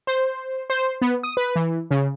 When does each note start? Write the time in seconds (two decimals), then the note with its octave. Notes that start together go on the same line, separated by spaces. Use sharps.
0.07 C5
0.70 C5
1.02 B3
1.23 D#6
1.37 B4
1.55 E3
1.91 C#3